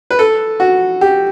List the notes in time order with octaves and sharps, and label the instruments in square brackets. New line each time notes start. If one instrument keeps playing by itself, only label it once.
[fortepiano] B4
A4
F#4
G4